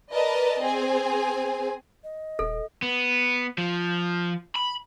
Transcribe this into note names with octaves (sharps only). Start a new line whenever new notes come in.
A#4 B4 D5 D#5 A5
C4 G#4 G#5
D#5
D#1 A4
B3
F3
B5